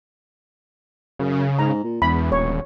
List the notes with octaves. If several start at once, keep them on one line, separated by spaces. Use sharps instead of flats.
F#2 C#3
G#2 A#5
A#2
E1 E2 B5
D#1 C#5